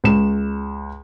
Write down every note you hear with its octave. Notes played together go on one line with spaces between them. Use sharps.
C#2 E7